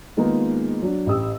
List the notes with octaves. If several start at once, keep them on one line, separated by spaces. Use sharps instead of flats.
D#3 G#3 A#3 B3 D#4 F4
F#3 D4
A1 G4 D#6 E6